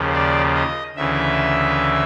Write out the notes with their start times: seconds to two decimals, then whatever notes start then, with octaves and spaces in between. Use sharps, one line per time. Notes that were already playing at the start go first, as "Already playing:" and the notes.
Already playing: D#2 C#3 F3
0.13 D5
0.55 D#5
0.96 D2 C#3 E3 E5